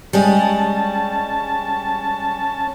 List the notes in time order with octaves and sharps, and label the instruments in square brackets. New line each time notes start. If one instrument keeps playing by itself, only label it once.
[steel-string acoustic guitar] G3 G#3 D#5 [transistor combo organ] C#4 A5